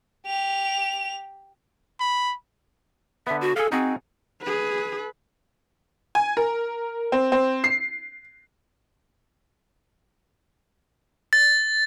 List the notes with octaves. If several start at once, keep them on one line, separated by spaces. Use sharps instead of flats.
G4 F7
B5
D3 B3 E5
F#4
G#4 A4 F5
C4 D#4 F#4 G#4
G#4 B4
G#5
A#4
C4
C4
C7
A6